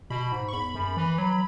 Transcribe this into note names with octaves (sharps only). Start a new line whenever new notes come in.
B2 B5
G#2
C#6
E2 B5
F#2
E3
F#3